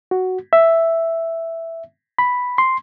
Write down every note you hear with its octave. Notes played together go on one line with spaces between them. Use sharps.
F#4
E5
B5
C6